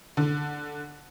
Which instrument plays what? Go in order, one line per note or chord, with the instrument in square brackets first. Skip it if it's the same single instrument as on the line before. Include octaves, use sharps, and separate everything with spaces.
[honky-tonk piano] D3